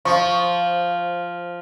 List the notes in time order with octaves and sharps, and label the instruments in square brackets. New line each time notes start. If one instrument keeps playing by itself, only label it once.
[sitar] F3 [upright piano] C#6